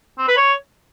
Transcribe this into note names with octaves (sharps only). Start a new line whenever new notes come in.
C4
B4
C#5